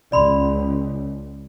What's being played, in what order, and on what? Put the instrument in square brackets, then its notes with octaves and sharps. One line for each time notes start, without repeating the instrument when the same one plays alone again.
[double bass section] C#2 [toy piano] D5 B5 C6